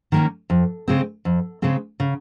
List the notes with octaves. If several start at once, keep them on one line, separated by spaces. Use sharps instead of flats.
D#3 A#3 C#4
F2
C#3 G#3 C4
F2
C#3 G#3 C4
C#3